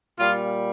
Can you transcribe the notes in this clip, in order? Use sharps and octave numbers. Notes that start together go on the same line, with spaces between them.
A#2 G3 F4